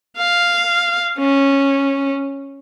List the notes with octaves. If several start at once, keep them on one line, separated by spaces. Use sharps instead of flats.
F5
C#4